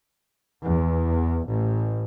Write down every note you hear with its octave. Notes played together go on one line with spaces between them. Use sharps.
E2
A1